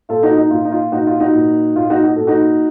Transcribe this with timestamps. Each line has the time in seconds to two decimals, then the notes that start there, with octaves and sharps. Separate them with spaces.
0.09 A#2 F4 A4
0.23 D#4 F#4
0.37 D#4
0.50 A#2 F4
0.65 D#4
0.72 F4
0.92 A#2 D#4 F#4
1.07 F4
1.20 D#4 F#4
1.34 A#2
1.76 A#2 F4
1.90 D#4 F#4
2.04 F#4
2.16 A#2 A4
2.27 D#4 F#4